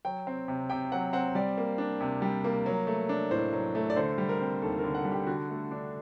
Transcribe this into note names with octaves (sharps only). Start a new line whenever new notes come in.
F#3 G5
C4
C3
C3 G5
F#3 F#5
C4 F#5
G3 D5
A#3
D4
C3
G3
A#3
F#3
A3
D4
A2 C5
F#3
A3
D5
D3 C5
G3
A#4
C4
D#2 A4
D3 A#4
F#5
G3
G4
D3 F#4
A3
D4